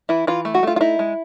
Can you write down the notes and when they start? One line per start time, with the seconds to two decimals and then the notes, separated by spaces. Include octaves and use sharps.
0.09 E3 E4
0.27 E3 F4
0.45 A3
0.54 F#4
0.63 A3 F4
0.76 F4
0.81 D#4 E4
0.99 G#3